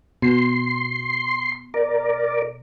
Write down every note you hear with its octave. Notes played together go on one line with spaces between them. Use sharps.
B2 C6
A#4 D5